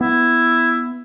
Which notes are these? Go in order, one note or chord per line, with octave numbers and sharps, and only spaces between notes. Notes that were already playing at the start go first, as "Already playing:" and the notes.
B3 E4